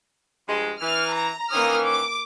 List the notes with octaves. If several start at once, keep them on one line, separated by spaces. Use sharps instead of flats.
G2 F3 G#3
E3 F6
A#5
D#3 E3 A#3 C#4 D#6 F6
D6